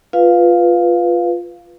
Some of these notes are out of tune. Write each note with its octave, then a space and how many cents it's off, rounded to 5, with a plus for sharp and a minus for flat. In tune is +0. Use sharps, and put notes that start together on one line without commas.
F4 +0 B4 +0 F5 +0